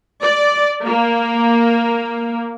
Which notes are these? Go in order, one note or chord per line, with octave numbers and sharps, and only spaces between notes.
D5
A#3